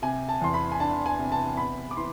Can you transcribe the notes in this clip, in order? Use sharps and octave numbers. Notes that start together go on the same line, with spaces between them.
C3 G#5
A5
E2 C6
B5
G#5
D4 A5
G#5
C3
A5
B3 B5
D6
E3 C6